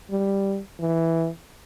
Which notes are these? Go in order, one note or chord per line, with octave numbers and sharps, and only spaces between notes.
G3
E3